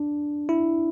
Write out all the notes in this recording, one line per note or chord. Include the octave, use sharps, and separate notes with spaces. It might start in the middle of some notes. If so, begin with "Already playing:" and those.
Already playing: D4
E4